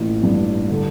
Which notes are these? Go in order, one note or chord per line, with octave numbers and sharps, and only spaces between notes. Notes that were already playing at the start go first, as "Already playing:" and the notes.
Already playing: A1 A#2
G2
D3